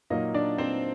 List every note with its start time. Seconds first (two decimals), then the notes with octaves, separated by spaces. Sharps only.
0.10 A#2 F#3 A#3 D#4 D#5
0.34 D4 D5
0.58 C4 C5